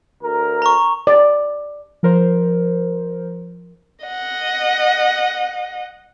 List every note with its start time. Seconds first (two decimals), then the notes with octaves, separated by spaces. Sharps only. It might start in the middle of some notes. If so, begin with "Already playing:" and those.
0.23 D2 A#4
0.62 A#5 C#6
1.07 D5
2.03 F3 A#4 C5
4.05 D#5 F#5